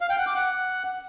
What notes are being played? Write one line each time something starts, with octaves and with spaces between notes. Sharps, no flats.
F5
G5
F#5
D6
F#5